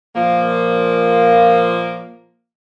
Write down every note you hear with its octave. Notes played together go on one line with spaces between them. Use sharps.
A#2 F3 A#3